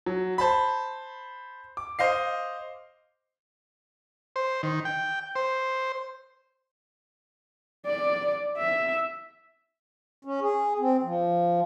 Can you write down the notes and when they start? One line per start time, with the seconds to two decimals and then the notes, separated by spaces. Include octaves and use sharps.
0.06 F#3
0.38 C5 A5 B5
1.77 D6
1.99 C5 D#5 F5 C7
4.36 C5
4.63 D#3
4.85 G5
5.36 C5
7.86 D5
8.58 E5
10.25 C#4
10.41 G#4
10.79 C4
11.03 F3